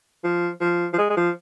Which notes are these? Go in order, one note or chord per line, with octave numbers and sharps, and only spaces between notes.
F3
F3
F3
G#3
G#3
F3